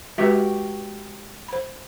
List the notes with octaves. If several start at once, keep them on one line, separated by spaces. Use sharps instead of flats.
G#3 F#4 G4 B4 E5
C5 B5